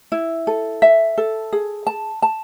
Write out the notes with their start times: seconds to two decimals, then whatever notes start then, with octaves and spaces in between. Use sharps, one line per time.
0.12 E4
0.47 A4
0.82 E5
1.18 A4
1.52 G#4
1.87 A5
2.22 A5